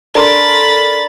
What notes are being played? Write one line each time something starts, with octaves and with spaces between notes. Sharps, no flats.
D4 A4 A#4 B5 C6 A6